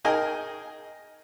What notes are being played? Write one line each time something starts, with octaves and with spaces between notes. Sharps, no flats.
D#4 G#4 A#4 D#5 G5 G#5